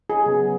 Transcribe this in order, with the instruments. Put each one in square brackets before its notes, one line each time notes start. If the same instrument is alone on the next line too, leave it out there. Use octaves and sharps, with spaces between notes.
[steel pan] G#4
[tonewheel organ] C#3 F#3 B3